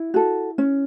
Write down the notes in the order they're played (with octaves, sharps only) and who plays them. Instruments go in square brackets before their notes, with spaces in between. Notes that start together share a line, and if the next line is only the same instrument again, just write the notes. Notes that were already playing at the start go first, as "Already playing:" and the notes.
Already playing: [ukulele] E4
F#4 A4
C#4